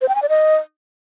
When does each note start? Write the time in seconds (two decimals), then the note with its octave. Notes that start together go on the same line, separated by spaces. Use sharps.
0.02 C5
0.08 G5
0.15 G#5
0.22 D5
0.29 D#5